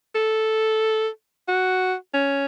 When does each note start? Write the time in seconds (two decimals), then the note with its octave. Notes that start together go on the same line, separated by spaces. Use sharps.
0.15 A4
1.48 F#4
2.14 C#4